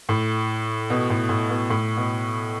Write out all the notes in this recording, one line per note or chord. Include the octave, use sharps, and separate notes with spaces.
A2
B2
A2
A2
B2
A2
B2